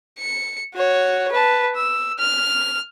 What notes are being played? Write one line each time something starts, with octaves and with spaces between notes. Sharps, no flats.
C#7
F#4 C#5
B4 A5
E6
F6